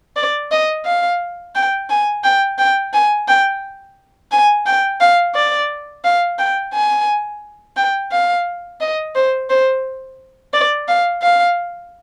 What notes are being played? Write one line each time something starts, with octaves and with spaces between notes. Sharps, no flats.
D5
D#5
F5
G5
G#5
G5
G5
G#5
G5
G#5
G5
F5
D5
F5
G5
G#5
G5
F5
D#5
C5
C5
D5
F5
F5